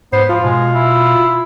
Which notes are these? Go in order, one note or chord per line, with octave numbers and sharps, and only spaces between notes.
G#2 B3 C5
F3 F4
B2 G#3
E4